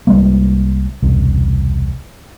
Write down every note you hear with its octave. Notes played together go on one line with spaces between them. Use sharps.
C2 G3 G#3 A#3
E1 C2